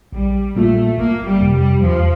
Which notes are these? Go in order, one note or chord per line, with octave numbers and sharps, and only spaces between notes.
A#1 G3
A#2 G3 A3 A#3 F4
G1 A#3
G3
F2 C3
G3
E2 F3